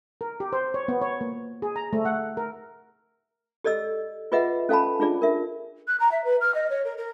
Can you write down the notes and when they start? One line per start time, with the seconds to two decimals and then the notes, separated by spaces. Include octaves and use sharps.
0.21 A#4
0.40 G4
0.53 C5
0.74 C#5
0.88 B3
1.01 C#5
1.21 A#3
1.62 G#4
1.76 A#5
1.93 A3
2.05 F#5
2.37 A#4
3.64 G4 A4 D5 D#5 E6
4.32 F4 G#4 B4 D#5 E5 F#5
4.69 C#4 A4 F5 G#5 A5 B5
5.00 D4 F4 G#4 D5
5.22 A#4 E5
5.87 F#6
5.99 A#5
6.11 E5
6.24 B4
6.40 F6
6.54 D#5
6.69 C#5
6.84 A#4
6.97 A#4